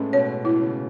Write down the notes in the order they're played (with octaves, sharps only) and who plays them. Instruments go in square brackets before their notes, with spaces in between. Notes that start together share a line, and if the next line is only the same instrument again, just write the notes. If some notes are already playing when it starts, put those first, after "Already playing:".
Already playing: [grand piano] A2 G#3 A3 B3 [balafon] C#4
[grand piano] B2 [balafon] C#5
[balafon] E4
[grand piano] C#3